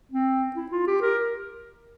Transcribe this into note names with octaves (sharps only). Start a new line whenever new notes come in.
C4
E4
F4
G4
A#4